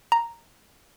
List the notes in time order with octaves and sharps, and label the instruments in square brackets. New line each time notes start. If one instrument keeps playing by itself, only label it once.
[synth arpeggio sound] A#5